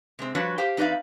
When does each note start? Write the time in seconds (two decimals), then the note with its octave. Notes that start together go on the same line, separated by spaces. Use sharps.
0.19 C3 G#3 C4
0.35 F3 G3 D4 F#4 B4 C#5
0.58 G4 C5 F5 G5
0.77 F2 D#4 B4 D5 E5 F5